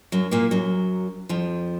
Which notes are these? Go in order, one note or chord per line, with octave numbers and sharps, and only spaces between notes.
F#2 F#3
A#2 A#3
F#2 F#3
F2 F3